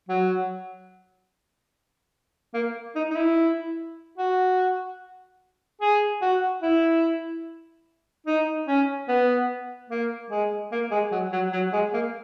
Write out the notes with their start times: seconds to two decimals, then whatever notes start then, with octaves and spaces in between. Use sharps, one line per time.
0.09 F#3
2.54 A#3
2.96 D#4
3.10 D#4
3.16 E4
4.18 F#4
5.81 G#4
6.22 F#4
6.62 E4
8.26 D#4
8.68 C#4
9.08 B3
9.90 A#3
10.30 G#3
10.72 A#3
10.91 G#3
11.12 F#3
11.33 F#3
11.53 F#3
11.73 G#3
11.94 A#3